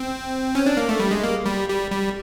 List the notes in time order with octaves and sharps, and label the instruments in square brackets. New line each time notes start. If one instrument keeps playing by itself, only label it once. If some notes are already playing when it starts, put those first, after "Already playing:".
Already playing: [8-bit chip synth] C4
C#4
D4
A#3
A3
G3
G#3
A#3
G3
G3
G3